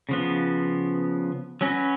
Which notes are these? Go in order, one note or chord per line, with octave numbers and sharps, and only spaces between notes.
C#3 F3 B3
F#3 C#4 F#4 B4